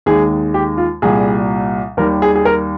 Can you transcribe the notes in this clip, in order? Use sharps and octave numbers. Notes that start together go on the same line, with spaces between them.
D#2 D#3 G#3 G#4
G4
F4
C2 A#2 G3 G#4
D#2 D#3 G3 A#4
G#4
G#4
A#4